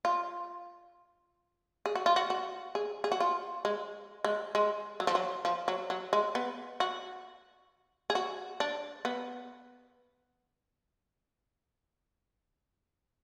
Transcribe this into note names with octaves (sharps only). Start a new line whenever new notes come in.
F4
G#4
F#4
F4
F#4
F#4
G#4
G#4
F#4
F4
G#3
G#3
G#3
F#3
F3
F#3
F3
F#3
F#3
G#3
B3
F#4
G#4
F#4
D4
B3